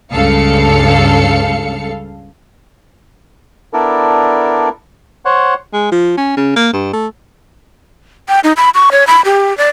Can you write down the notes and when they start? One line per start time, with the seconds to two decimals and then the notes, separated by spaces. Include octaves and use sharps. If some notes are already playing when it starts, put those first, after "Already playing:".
0.12 C#2 G2 C#3 A4 F5 C#7
3.73 B3 D4 E4 A4 A#4 D5
5.25 C5 C#5 F#5
5.73 G#3
5.92 F3
6.17 C#4
6.37 C#3
6.56 A#3
6.73 G2
6.93 A3
8.28 G5
8.44 D#4
8.57 B5
8.75 C#6
8.92 C#5
9.07 B5
9.25 G4
9.58 D5